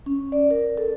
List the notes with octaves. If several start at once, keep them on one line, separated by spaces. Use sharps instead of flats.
C#4
D5
A#4
A4